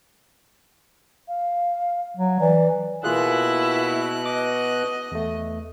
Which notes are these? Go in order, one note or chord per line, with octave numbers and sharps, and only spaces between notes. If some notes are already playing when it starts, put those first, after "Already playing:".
F5
F#3
E3 D5
B2 A#3 E4 F4 G#4 F#6
D#5 D6
E2 A3